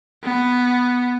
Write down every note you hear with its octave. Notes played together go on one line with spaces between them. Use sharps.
B3